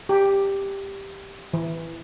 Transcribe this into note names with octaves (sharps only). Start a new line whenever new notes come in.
G4
E3